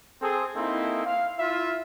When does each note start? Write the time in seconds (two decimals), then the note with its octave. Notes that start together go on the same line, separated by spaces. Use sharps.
0.21 C4 G#4 A4
0.55 A#3 C4 D#4 E4 G#4 A4
1.05 F5
1.39 E4 F4 E5